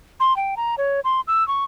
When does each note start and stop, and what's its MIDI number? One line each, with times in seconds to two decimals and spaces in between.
0.20 0.36 84
0.36 0.55 79
0.57 0.75 82
0.78 1.00 73
1.04 1.21 84
1.27 1.46 88
1.48 1.64 85